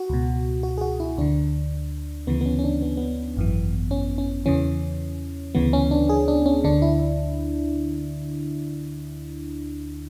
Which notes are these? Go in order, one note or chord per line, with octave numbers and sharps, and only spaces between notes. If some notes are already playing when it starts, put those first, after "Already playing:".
Already playing: F#4
C#2 B2
F#4
G#4
F#4
E4
D2 D3 D4
D2 C#3 E3 B3
B3
C#4
C#4
D4
B3
B3
G#1 F#2 E3
C#4
C#4
E2 C#3 E3 C#4
D2 C#3 E3 B3
C#4
D4
G#4
D4
C#4
D2 D3 D4
E4